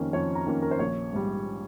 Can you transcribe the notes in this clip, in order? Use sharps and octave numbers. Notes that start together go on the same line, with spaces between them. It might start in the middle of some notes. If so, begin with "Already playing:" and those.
Already playing: F2 D#3 A#3 C#4
F2 C#5
A#5
D#3 A#3 C#4
A#4
C5
A#1 C#5
G#2 G3